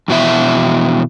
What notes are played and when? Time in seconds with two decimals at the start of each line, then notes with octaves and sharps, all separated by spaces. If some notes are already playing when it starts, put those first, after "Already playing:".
0.08 F2 B2 E3 E5